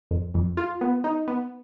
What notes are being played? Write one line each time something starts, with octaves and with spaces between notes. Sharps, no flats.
F2
F2
F4
B3
D#4
B3